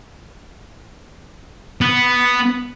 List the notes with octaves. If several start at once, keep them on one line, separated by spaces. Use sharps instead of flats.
B3